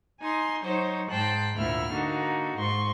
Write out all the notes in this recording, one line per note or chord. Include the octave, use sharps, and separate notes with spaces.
D#4 G#5 C6
F#3 D#4 C5 C#5
G#2 G5 A5 C6 F#6
D2 A#2 E4 E5 F6
D3 A#3 D#4 F#4
G#2 C6 C#6